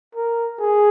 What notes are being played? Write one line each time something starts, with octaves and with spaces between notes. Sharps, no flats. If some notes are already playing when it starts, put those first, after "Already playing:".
A#4
G#4